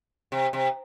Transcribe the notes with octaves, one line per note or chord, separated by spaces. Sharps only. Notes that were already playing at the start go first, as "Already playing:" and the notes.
C3
C3